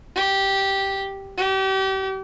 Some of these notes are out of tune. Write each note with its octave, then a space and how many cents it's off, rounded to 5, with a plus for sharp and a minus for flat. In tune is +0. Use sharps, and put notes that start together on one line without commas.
G4 -5
G4 -35